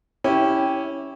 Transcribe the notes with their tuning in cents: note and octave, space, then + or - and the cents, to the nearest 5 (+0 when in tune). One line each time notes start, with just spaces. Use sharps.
C#4 +0 E4 -15 G4 +0